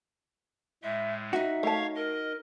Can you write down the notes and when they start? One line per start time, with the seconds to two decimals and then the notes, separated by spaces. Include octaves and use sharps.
0.83 A2 G#3 E5
1.33 D#4 F#4 E5
1.63 A3 C#5 F5 A5 C#6
1.96 A#4 D#5